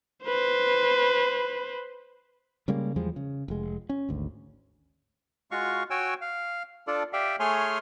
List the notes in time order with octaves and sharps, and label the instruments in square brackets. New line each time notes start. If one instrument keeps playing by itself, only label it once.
[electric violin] B4 C5
[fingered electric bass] C#3 G3 G#3 A#3
E2 F3 G3 G#3
C#3
F1 G#3
C#4
G#1 D2
[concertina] G#3 F4 F#4 F5 C#6
F#4 C#5 G5 G#5 E6
F5
D4 F4 A4 D5
G4 D5 E5 F5 G5
A3 G#4 C#5 G#5 C6 F6